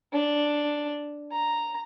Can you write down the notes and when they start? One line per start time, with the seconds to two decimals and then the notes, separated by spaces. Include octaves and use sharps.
0.13 D4
1.32 A#5